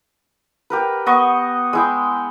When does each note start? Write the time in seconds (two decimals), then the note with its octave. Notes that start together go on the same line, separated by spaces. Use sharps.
0.70 G4 A#4 B4
1.06 B3 D#5 C#6
1.73 G#3 E4 G5